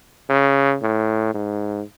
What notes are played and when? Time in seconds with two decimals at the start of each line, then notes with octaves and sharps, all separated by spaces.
0.29 C#3
0.82 A2
1.34 G#2